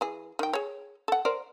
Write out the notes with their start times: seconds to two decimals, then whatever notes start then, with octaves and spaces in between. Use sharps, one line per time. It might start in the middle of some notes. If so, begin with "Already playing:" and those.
0.01 E3 G#4
0.39 D#3 G5
0.53 G#4 C#5
1.08 A4 F#5
1.25 A#4 C5 D5